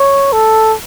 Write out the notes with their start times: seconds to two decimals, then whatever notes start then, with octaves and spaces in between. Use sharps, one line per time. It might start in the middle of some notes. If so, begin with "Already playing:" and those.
Already playing: C#5
0.33 A4